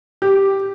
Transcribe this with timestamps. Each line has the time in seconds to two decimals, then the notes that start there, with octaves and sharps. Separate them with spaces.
0.22 G4